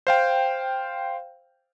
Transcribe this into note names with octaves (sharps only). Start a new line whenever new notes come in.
C5 F5 G5